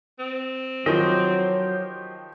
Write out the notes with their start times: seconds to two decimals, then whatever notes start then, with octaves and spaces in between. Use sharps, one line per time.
0.19 C4
0.86 D#3 F3 F#3 G4 C5 D#5